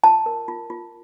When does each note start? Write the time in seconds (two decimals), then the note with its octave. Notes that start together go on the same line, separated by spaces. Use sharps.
0.04 F4 A5
0.26 A#4
0.48 F4
0.70 F4